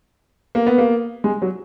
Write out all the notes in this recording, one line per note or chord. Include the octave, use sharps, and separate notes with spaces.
A#3
B3
A#3
G#3
F#3